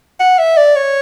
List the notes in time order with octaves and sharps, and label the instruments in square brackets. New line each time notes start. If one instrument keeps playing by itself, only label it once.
[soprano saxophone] F#5
E5
D5
C#5